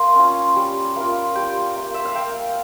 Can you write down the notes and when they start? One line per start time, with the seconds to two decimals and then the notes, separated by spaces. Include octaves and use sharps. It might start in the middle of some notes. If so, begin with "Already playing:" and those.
Already playing: A#3 C6
0.16 C#4 F4
0.56 G3
0.96 A#3 F4
1.35 G3 G5
1.76 A#3 F4
1.94 E5
2.05 F5
2.15 A#3 G5